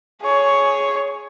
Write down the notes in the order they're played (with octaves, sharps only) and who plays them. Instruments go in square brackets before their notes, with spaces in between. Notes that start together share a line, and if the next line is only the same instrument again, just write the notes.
[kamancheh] G#4 C#5